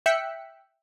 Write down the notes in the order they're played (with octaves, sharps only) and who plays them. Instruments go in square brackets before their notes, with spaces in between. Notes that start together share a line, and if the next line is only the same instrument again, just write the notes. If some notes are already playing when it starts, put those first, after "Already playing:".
[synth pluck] E5 G5 E6 F#6 B6 C#7